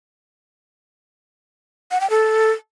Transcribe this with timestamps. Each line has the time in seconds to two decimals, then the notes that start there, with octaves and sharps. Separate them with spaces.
1.91 F#5
2.01 G5
2.10 A4